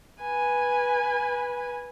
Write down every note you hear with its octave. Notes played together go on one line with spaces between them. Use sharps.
B4 G#5